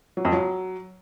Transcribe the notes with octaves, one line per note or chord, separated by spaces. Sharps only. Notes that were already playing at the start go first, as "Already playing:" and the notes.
F#3
F2
F#3